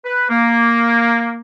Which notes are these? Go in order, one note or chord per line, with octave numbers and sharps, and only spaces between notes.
B4
A#3